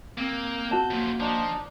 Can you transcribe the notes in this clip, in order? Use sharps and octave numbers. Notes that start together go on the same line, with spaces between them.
A#3 C4
G6
F#4 A5
F#2 F3 A#3
F3 D4 D#4